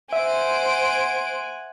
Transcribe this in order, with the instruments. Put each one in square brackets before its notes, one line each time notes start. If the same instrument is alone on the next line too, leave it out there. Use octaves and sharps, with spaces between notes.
[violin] C5 D7 [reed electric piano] E5 [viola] F#5 G#5